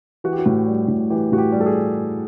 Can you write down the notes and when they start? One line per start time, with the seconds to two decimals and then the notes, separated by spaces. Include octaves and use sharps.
0.24 E3 F#4
0.33 G4
0.39 F#4
0.46 A2
0.67 G3
0.88 A2
1.10 E3 G4
1.32 A2 F#4
1.38 G4
1.52 G3
1.60 A4
1.66 G#4